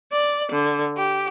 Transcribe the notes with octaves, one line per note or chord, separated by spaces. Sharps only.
D5
D3
G4